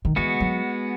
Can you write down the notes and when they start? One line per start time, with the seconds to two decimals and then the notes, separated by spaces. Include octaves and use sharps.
0.05 D#3
0.16 E3 G#3 B3 F#4
0.40 F#3